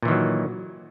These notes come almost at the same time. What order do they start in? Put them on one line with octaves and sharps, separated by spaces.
A#2 E3 D#3 F#3